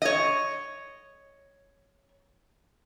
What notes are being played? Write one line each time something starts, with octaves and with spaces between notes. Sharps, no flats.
C#5 D#5